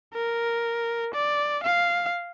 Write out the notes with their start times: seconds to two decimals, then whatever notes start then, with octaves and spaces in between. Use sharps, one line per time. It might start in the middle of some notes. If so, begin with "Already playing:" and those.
0.14 A#4
1.14 D5
1.64 F5